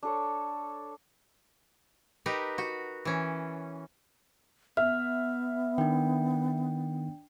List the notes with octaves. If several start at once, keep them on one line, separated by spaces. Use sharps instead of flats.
D4 A4 C#5
D#4 G4 A#4 B4
F#4
E3 C#4
B3 E5 F6
D#3 D4 G5